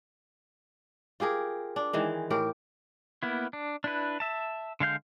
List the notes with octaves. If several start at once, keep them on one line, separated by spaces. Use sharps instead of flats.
F4 G4 G#4 A#4
D4
D#3 E3 G#3
A2 G4 A#4
A#3 B3 E4
D4
D4 E4 B4
E5 A5
D3 G#3 F5 G6